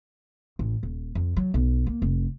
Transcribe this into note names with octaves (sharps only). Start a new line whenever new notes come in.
A1
D#1
F2
F#3
B1
A#3
F1